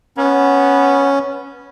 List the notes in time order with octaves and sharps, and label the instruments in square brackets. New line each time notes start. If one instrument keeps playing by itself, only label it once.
[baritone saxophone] B3 [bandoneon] C#4